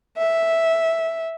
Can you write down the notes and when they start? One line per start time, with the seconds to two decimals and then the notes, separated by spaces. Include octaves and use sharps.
0.17 E5